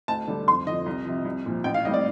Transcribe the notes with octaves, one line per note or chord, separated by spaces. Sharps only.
D2 A5
D3 G3
F2 C6
D3 F3 D#5
C2
C3 F3
C2
A#2 F3
A1 G5
F5
A2 G3 C4 D#5
D5